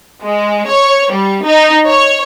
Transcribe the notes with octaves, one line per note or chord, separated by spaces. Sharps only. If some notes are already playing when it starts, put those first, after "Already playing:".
G#3
C#5
G3
D#4
C#5